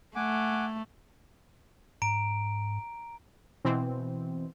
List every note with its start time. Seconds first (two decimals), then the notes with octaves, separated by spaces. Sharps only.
0.15 A3 F#5 G#5 D6
2.02 G#2 A#5 D7
3.65 B2 E3 C4